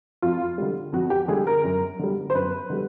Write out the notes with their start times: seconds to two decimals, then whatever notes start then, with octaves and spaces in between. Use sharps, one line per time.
0.22 F2 F4
0.58 D3 G3
0.93 F2 F#4
1.10 G4
1.28 D3 G3 G#4
1.47 A#4
1.64 F#2
1.99 D3 G3
2.30 C5
2.34 F#2 B4
2.70 D3 G3